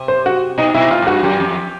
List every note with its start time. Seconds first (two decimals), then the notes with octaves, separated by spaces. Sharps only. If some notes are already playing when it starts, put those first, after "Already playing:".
Already playing: C3
0.08 C5
0.26 F#4
0.58 B2 D#4
0.74 B2 E4
0.91 A2 F4
1.02 G#2
1.07 G2 F#4
1.23 F#2 G4
1.40 F2